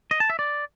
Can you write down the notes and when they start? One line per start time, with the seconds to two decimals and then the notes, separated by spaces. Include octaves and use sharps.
0.11 D#5
0.20 A5
0.30 E5
0.39 D5